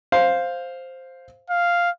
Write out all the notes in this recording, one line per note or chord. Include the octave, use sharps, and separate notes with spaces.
C5 F5
F5